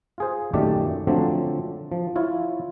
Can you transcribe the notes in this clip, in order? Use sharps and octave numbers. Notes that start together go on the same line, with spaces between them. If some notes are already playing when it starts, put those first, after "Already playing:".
F4 G#4 C5
F#2 A#2 D#3 A3 G4 D5
D3 F3 F#3 A3 C4 D4
F3
E4 F4 C#5